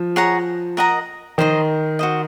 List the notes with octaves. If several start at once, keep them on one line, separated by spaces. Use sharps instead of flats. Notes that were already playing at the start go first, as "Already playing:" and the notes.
Already playing: F3
G#4 C#5 F#5 A#5
A#4 D#5 F#5 A#5
D#3 C5 D#5 A#5
F#4 C5 D#5